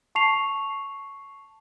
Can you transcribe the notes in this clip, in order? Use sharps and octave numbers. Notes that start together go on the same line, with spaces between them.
A5 C#6 C7 F7